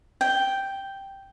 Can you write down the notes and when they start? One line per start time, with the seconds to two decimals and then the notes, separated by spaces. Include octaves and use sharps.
0.21 G5